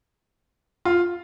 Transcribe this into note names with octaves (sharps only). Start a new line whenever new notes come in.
F4